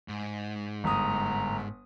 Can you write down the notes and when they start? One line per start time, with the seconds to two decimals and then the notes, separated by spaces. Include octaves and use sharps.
0.09 G#2
0.84 G1 A#5 D#6